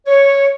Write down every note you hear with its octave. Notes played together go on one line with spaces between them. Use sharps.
C#5